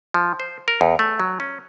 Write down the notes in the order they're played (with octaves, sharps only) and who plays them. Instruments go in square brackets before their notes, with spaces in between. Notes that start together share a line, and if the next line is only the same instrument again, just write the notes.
[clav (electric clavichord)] F3
C5
A#4
E2
A3
F#3
C#4